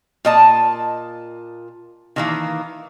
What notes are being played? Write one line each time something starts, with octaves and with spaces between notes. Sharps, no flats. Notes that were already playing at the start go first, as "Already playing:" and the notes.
A#2 D#5 A5
D#3 E3 A#3